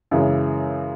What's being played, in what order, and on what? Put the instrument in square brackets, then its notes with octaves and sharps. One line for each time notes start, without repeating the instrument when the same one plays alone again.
[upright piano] F#2 C#3 E3 G#3